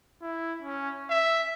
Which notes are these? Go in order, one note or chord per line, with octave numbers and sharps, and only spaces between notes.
E4
C#4
E5